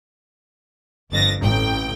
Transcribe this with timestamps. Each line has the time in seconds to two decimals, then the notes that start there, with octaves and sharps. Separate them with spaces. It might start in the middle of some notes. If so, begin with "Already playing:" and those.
1.10 G1 F2 A6 A#6
1.41 A1 G5